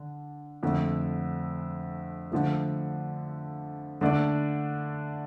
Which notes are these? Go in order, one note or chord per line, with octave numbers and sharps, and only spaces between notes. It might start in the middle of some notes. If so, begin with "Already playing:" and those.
Already playing: D3
F2 D3 A3
D3 F3 A3
D3 A3 D4 A4 D5